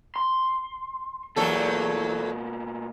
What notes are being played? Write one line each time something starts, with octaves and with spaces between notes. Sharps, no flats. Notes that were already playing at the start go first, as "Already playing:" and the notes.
C6
E2 B2 F#3 A#3 A4